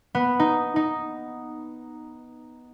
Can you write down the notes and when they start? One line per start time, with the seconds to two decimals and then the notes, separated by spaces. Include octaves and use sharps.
0.15 B3
0.40 D#4
0.76 D#4